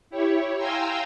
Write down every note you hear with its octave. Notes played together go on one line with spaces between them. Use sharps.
E4 G4 C#5
F5 G5 G#5 A#5 C6 E6